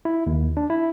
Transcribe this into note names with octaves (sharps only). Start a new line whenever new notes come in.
E4
D#2
D4
E4